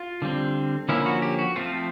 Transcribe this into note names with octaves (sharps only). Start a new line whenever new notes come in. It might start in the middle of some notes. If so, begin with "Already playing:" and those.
Already playing: F4
D3 G3 C4
D3 F3 A#3 C#4 E4
F#4
G4
F#4
F3 A3 C4 F4